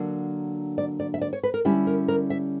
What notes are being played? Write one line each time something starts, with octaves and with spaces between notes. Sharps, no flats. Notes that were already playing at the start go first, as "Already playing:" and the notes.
Already playing: D3 F#3 A#3 D4
D5
D5
E5
D5
C#5
B4
A#4
D3 G3 C#4 E4 G4
A#4
A#4
E5